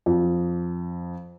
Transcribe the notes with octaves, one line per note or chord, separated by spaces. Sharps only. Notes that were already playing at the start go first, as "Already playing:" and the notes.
F2